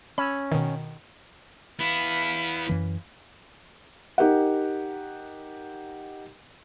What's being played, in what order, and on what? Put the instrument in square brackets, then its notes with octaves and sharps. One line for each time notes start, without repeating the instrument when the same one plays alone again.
[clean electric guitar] C#4 [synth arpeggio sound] B5 E6
[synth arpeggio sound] B2 D#3
[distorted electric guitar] B3 E4 [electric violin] F5 B5
[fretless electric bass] F#2 E3
[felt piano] D#4 G4 A#4 F#5